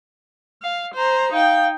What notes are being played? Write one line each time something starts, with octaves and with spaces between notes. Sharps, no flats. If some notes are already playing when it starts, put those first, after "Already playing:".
F5
C5 A#5
D#4 F5 G5